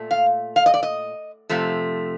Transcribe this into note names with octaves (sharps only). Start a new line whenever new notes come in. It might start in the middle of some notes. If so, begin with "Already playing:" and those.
Already playing: A#2 A3
F5
F5
D#5
D5
D#5
F2 C3 F3 A3